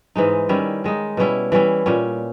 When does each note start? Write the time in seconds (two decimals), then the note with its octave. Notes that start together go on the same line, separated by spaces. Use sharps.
0.16 G#2 E3 G#3 D#4
0.49 D#3 G3 C#4 E4
0.84 D#3 G#3 D#4
1.17 B2 G3 C#4 E4
1.52 E3 G3 C#4 E4
1.86 A#2 G3 C#4